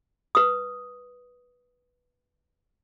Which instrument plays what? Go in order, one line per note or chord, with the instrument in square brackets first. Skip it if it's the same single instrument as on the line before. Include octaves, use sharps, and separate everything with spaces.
[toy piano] B4 D#6